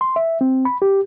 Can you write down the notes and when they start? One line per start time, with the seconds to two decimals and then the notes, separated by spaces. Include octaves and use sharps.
0.01 C6
0.16 E5
0.41 C4
0.65 B5
0.82 G4